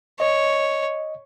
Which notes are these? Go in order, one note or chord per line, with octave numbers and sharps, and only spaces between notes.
C#5 D#5